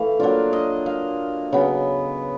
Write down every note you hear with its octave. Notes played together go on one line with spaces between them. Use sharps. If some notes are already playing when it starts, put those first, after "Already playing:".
Already playing: E3 A3 F5
F#3 A#3 D4 F4 D5
D#5
F5
C#3 F#3 B3